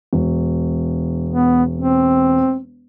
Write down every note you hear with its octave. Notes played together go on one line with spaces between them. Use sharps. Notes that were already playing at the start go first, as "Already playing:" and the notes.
E1
B3
C4